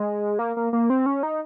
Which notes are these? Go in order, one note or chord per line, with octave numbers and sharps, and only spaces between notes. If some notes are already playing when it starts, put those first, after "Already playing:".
Already playing: G#3
A#3
A#3
A#3
C4
C#4
D#4